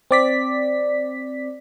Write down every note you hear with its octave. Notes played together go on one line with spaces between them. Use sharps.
C4 D5 B6